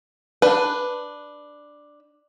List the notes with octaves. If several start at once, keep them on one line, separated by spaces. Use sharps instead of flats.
D4 B4